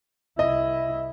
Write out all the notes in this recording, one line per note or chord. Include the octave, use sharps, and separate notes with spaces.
C2 E4 D#5